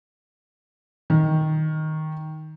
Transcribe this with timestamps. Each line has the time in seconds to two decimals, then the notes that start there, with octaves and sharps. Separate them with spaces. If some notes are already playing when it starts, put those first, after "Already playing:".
1.10 D#3